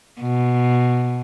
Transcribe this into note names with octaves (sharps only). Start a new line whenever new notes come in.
B2